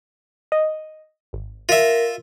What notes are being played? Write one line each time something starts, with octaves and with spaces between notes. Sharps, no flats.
D#5
G#1
F4 A#4 E5